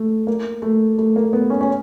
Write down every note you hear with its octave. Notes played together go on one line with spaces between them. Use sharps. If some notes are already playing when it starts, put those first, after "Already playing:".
Already playing: A3
A#3
A3
A3
A#3
B3
C#4
C#4